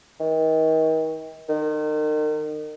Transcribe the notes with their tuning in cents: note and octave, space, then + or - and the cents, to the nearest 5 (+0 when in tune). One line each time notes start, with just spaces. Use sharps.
D#3 +35
D#3 -35